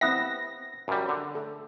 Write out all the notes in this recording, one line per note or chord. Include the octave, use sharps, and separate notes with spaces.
B3 C4 E4 E5 F#5 A#6
F#2 G3
D3
A4